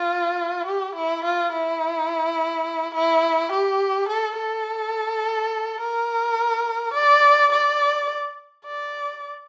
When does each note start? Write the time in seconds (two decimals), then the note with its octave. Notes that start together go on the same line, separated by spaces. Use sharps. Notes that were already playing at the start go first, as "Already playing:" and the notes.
Already playing: F4
0.67 G4
0.95 E4
1.24 F4
1.52 E4
2.94 E4
3.52 G4
4.09 A4
4.37 A4
5.80 A#4
6.94 D5
7.52 D5
8.66 D5